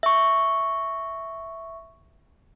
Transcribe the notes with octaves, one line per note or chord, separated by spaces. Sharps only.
E5 C#6